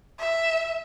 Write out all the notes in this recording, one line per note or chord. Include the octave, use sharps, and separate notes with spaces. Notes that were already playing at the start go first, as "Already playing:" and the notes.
E5